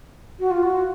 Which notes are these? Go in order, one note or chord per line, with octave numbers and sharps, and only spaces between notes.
F#4
F4
F#4